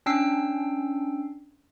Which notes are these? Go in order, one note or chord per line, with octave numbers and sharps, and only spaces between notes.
C#4 D4 G5 E6 C7